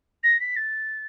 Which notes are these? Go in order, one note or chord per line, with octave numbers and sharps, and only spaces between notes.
A#6
B6
A6